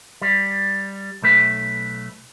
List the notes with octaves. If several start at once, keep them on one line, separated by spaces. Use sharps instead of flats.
G3
B1 A3 B4